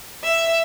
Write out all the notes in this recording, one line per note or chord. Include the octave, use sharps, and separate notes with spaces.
E5